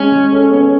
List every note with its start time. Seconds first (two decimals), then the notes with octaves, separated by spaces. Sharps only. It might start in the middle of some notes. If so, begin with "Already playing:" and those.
Already playing: G#3 C#4
0.12 G#3
0.32 A4
0.52 B3